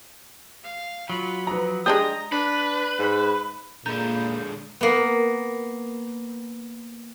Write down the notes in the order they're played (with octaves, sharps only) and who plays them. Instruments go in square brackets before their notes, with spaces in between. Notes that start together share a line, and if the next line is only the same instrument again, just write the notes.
[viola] F5
[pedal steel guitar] F#3 [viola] F4 B5
[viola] F3 [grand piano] B4 A#5
[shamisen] G#3 D4 G4 [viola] A#5 [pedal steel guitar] D#6 [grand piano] G6
[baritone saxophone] D4 [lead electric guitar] B4
[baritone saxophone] G#2
[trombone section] A#2 [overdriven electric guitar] D3 G#3 [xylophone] A#5 [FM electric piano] B5 G6
[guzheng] A#3 B3